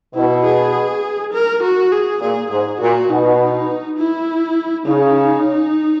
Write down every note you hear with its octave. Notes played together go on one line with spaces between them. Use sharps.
B2 E4
G#4
A#4
F#4
G#4
A#2 G#4
G#2 G#4
A#2 F#4
B2 D#4
E4
C#3 D#4